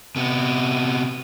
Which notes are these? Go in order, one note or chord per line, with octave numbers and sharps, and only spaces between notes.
C3 B3